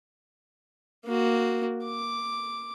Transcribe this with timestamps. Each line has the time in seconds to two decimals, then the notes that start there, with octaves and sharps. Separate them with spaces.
1.06 A#3 F#4
1.85 D6